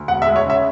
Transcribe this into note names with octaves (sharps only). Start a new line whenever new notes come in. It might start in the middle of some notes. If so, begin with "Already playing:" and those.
Already playing: D2
E1 F#5
E5
G#3
C#5
C#3 E5